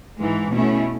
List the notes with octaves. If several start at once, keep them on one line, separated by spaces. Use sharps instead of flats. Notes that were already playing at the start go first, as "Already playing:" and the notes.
G#2 E3 G#3
B2 A3 C#4 E4